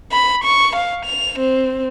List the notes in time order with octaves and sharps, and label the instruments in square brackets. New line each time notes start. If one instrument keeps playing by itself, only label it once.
[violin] B5
C#6
F5
F7
C4